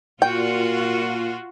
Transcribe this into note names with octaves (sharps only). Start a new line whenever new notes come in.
A#2 F4 F#4 G5